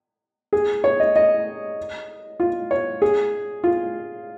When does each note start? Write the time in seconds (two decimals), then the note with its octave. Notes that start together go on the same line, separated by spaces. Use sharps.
0.53 G#4
0.84 C#5
1.00 D#5
1.16 D#5
2.40 F4
2.71 C#5
3.02 G#4
3.64 F4